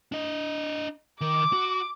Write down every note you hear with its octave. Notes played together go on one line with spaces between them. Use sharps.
D4 D#5
D#3 D6
F#4